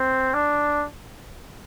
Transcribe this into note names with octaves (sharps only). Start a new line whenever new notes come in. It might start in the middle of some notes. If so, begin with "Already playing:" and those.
Already playing: C4
D4